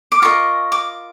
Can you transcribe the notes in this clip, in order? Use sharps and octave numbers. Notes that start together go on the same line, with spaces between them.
D6
F4 A#4 D#5 C#6
D6